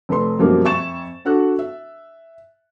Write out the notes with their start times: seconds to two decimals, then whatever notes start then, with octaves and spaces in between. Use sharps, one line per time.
0.09 F1 A3 B4 C6
0.39 F#2 B2 F3 G3 A#3
0.64 F2 E5 G#5 C#6 A6 E7
1.25 D4 F#4 A4 F#6
1.59 E5